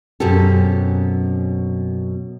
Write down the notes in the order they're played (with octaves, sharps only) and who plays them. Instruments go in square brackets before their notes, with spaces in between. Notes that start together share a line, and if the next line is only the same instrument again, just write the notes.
[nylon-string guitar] F#2 B2 C4 C#4 G4 A4